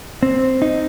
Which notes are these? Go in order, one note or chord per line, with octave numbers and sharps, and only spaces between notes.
C4
D#4